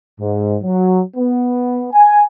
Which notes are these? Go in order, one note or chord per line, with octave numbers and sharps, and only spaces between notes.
G#2
F#3
B3
G#5